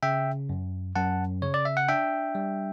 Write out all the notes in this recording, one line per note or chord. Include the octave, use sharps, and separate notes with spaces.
C#3 E5 G5
F#2
F#2 F#5 A5
C#3 C#5
D5
E5
F#5
D4 E5 G5
G3